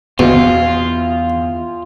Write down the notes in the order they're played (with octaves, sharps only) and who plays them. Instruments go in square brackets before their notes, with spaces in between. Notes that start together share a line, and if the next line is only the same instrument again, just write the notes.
[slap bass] E2 [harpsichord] B2 [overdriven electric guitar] F4